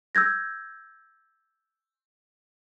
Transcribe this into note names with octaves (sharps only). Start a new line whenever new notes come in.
E6 G6 G#6 A#6